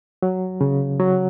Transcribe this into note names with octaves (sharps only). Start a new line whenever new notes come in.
F#3
C#3
F#3